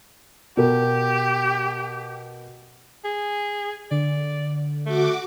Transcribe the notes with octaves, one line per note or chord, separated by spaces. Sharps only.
B2 G4 A#4
G#4
D3 D5
A3 F#4 D6